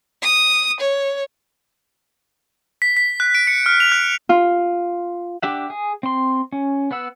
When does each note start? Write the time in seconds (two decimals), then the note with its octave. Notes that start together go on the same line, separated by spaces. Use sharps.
0.22 D#6
0.80 C#5
2.82 B6
2.97 B6
3.20 F#6
3.35 D7
3.47 C#7
3.66 F6
3.80 F7
3.92 F#6
4.29 F4
5.42 D4 G4 E5 F#5
5.70 G#4
6.03 C4 C6
6.52 C#4
6.91 B3 B4 F#5 E6